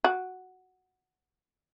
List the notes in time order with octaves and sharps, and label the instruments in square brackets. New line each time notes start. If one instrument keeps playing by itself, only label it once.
[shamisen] F#4